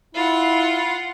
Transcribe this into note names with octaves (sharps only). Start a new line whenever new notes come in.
E4 F4 F#5